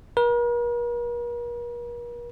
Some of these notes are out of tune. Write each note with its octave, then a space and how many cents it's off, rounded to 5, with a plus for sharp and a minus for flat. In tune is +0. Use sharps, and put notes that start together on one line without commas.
A#4 +45